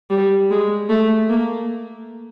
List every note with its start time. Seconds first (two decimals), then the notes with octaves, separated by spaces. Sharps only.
0.10 G3
0.50 G#3
0.89 A3
1.29 A#3